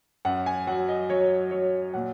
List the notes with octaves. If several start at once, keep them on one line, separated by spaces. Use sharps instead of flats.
F#2 F#5
G#5
F#3 F#5
D#5
F#3 C#5
F#3 C#5
A#2 F#5